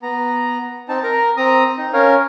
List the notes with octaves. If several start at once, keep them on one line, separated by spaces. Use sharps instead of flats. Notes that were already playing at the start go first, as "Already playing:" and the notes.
B3 A#5
C4 D#4 A5
A#4 A#5
C4 A#5 D#6
D#4
C#4 A#4 C#5 F5